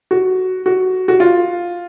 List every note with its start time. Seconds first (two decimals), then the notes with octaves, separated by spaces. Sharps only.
0.11 F#4
0.66 F#4
1.08 F#4
1.20 F4